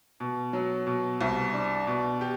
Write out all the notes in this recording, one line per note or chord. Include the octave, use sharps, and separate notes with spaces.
B2
F#3
B2
C2
D4
B2
G4